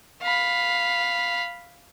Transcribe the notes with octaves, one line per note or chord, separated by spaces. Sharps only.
F5 B5